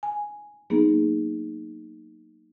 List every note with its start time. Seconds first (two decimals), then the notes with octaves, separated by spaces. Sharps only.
0.03 G#5
0.70 F#3 A#3 B3 D#4 G#4